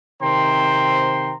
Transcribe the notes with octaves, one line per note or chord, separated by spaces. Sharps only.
C3 D#3 C5 G5 A#5 C6